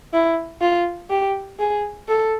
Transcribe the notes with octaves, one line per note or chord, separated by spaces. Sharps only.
E4
F4
G4
G#4
A4